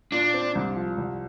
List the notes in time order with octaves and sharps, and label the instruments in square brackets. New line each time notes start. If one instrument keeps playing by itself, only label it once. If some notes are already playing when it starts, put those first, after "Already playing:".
[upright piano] A#2 [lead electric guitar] D4
[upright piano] C4
C2
F3
C2